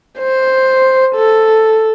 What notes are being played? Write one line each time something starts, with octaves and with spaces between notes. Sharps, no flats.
C5
A4